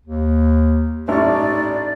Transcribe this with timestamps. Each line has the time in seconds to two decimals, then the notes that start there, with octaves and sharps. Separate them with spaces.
0.06 D#2
1.08 A1 D#4 D5 C#6